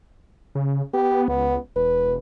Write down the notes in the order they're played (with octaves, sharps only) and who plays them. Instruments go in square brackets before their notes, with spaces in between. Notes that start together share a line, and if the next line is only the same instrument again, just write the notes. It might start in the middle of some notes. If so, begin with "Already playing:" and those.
[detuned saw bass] C#3
[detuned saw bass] B3 [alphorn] G4
[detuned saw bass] C#2 [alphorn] B3
[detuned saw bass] E1 [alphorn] B4